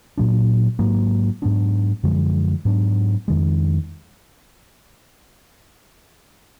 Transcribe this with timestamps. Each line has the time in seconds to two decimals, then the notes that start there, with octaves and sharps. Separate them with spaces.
0.17 A#2 F#3 D4
0.79 G#2 F#3 A#3
1.42 G#2 F#3 B3 D4
2.03 F#2 D3 F3 G#3
2.65 G#2 F#3 B3 D4
3.28 F2 D#3 G#3